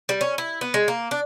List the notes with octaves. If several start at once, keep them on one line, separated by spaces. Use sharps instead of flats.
G3
C#4
E4
B3
G#3
A#3
D4